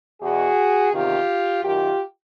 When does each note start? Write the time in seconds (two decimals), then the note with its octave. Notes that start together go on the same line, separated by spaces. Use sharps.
0.21 E2 B2 F#4 G#4
0.93 E2 C3 D#3 F4 G4
1.64 F#2 D#3 F4 G4